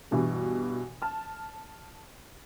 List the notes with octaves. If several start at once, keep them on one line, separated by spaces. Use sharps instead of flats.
G2 B2 E3
A5 F6